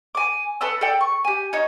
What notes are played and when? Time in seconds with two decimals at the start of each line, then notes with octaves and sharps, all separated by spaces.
0.15 G#5 D6
0.61 A4 B4 A5 E6
0.81 A4 D5 G5
1.01 C#6
1.25 G4 G#5
1.53 D#4 C#5